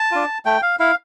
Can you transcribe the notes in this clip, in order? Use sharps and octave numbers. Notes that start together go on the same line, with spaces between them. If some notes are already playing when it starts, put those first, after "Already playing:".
Already playing: A5
D4 F4
A3 G5
F5
E4 F5